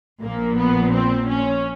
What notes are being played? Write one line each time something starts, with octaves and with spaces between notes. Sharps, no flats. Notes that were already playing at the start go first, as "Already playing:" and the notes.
A#1 A#2 F3 A#3
B3
C4
C#4